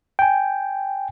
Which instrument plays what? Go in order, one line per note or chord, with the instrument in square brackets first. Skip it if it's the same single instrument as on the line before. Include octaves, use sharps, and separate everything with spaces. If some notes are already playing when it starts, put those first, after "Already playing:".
[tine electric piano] G5 G#5